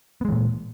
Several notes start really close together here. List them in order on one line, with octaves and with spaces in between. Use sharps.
B3 G#3 E3 A#2